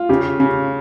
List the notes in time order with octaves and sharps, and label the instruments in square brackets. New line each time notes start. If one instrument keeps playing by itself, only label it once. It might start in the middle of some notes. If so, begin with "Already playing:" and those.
Already playing: [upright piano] F4
[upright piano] C#3 [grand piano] G4
[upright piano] C#3